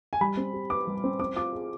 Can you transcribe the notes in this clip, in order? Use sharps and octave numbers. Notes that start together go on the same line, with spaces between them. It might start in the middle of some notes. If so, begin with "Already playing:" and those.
G#5
G3 B5
C4
G4
B4 D6
G3
C4
C4 D6
F4 D6
G#4